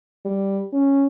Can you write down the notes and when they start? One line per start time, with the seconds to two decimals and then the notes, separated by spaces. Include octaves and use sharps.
0.25 G3
0.73 C#4